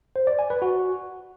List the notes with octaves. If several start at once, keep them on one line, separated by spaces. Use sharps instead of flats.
C5
D5
G#5
B4
F#4